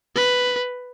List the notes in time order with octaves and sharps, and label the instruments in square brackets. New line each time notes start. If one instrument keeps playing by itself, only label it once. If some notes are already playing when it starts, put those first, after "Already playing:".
[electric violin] B4